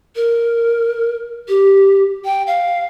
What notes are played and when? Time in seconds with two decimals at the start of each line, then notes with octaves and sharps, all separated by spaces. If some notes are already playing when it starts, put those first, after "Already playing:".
0.16 A#4
1.48 G4
2.25 G5
2.47 F5